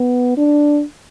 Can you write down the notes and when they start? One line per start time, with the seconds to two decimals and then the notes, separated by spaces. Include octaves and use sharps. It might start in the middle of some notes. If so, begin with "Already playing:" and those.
Already playing: B3
0.37 D4